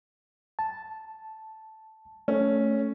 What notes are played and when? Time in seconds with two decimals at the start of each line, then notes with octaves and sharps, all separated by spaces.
0.59 A5
2.28 A3 C#4